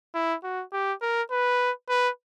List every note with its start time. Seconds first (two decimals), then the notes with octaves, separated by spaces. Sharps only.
0.15 E4
0.44 F#4
0.73 G4
1.02 A#4
1.31 B4
1.89 B4